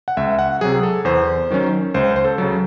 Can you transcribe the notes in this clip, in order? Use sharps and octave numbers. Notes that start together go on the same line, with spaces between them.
F#5
C#2 E5
F#5
C3 F#3 G#4
A4
E2 C5
D#3 F#3 C#4
C#2 C5
C5
A4
C#3 F#3